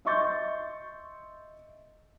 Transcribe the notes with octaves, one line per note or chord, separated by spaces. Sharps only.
D#5 E5 C6 C#6 G6 A6